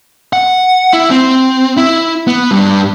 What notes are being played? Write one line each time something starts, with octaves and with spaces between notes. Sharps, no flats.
F#5
E4
C4
E4
B3
G2